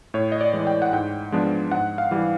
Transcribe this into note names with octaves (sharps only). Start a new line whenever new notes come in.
A2 C#5
D#5
D5
E3 G#3
G5
F#5
G#2 G5
F3 G#3 B3 D4
G#2 F#5
F5
E3 G3